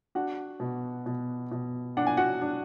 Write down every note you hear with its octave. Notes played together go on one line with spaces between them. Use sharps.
D4 F#4 F#5
B2
B2
B2
D4 F#5
G#5
F#4 F#5
D4